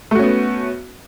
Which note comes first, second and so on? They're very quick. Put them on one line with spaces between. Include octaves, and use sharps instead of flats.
A3 F#4 C#4 B3